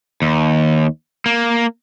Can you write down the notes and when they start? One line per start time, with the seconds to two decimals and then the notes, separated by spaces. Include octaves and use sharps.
0.22 D#2
1.26 A#3